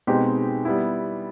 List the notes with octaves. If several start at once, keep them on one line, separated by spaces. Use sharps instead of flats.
B2 G#3 C4 D#4 G4
G3 B3 E4